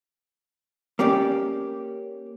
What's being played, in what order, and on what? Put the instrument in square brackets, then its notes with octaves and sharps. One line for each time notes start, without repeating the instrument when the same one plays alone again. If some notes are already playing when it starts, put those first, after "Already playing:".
[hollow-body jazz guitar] A#3 C#4 G4 D5